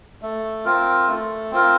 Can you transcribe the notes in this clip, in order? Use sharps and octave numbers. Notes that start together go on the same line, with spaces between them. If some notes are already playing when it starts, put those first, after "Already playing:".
A3
C4 F4 A#4
A3
C4 F4 A#4